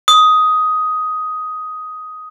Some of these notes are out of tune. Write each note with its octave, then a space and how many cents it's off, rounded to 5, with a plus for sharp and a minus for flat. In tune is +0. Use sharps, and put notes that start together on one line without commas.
D#6 +10